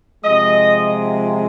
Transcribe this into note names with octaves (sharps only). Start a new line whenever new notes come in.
C3 F3 G#3 D#5